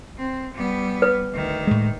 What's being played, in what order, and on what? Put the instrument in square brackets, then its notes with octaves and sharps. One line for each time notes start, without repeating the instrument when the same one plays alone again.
[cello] C4
G3 B3
[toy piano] B4
[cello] D2 D#3
[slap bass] A2 G#3